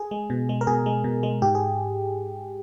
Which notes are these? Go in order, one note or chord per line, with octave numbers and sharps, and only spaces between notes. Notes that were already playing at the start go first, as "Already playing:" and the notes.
Already playing: G#4
G#3
B2
G#3
A#4
B2 G#4
G#3
B2
G#3
G#2 G4
G#4